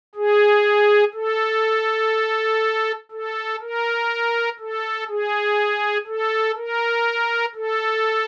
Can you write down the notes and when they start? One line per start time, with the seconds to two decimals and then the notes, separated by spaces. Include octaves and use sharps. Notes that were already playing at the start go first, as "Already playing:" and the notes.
0.15 G#4
1.14 A4
3.12 A4
3.60 A#4
4.60 A4
5.09 G#4
6.07 A4
6.57 A#4
7.55 A4